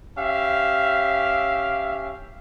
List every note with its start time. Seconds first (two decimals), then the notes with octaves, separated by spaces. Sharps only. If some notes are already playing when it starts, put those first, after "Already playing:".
0.18 C#4 G4 E5 F5